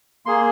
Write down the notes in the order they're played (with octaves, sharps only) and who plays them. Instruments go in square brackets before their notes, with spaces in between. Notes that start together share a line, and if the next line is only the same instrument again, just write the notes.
[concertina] A#3 G#4 C6